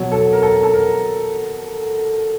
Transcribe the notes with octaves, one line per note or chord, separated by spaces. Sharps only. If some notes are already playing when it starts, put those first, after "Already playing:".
Already playing: B2 F#3
A4
A#4
A4
A4
A#4